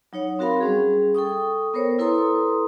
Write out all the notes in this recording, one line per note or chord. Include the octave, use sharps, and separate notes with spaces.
F#3 D#4 C#5 F#5
C4 F#4 A#4 F5 B5 C6
G3 C#4 G#4
A4 G5 C#6 D#6
B3 A#4 C5 C#5
E4 A4 B4 A#5 C6 D#6